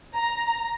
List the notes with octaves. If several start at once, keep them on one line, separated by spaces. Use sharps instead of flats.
A#5